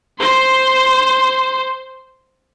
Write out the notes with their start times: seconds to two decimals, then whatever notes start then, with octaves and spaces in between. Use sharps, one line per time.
0.19 C5 C6